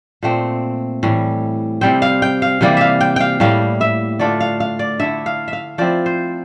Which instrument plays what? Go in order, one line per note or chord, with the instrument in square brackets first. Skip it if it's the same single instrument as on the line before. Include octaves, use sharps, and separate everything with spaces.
[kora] A#2 A3 C4
A2 E3 G3
C3 G3 C4 G5
F5
G5
F5
C3 E3 G3 A#3 D5
E5 F5
G5
F5 G5
A2 G3 A#3 E4 F5
E5
D3 A3 D4 F4 D5
F5
F5
D5
D3 A3 E4 E5
F5
E5
F5
F3 C4 E4 D5
C5